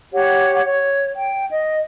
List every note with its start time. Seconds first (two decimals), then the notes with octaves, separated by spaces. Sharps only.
0.13 G4 C#5 F#5
0.66 C#5
1.15 G5
1.49 D#5